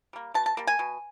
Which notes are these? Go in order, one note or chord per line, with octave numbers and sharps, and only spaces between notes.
G3 A#3
B2 A5
A5
G3 A#3
G#5
B2